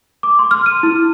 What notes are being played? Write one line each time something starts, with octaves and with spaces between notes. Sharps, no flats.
D6
C6
F6
D#7
E4